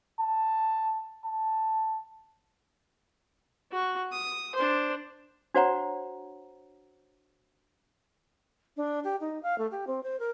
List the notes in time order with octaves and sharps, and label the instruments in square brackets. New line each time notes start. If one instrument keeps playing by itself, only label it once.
[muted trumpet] A5
A5
[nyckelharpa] F#4 C#6
D#6
D4 C5
[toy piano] D4 F#4 C5 C#5 F#5 A#5
[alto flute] D4
G4
D#4
F5
A3
G4
C4
C5
A#4